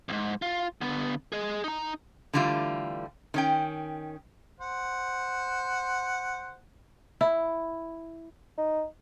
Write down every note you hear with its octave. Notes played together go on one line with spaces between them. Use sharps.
C2 G#2
F4
D3 B3
G#4 D#5
D#4 A#5
D3 E3 G3 A3 F4
D#3 C#4 G5
C5 F#5
E4
D#4